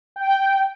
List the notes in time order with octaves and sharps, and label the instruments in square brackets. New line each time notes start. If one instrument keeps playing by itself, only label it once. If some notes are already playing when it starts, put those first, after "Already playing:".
[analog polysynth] G5